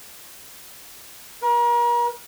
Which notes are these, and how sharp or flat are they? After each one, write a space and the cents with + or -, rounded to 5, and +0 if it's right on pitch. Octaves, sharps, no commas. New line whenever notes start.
A#4 +40